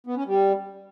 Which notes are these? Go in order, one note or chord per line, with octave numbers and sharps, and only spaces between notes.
B3
C#4
G3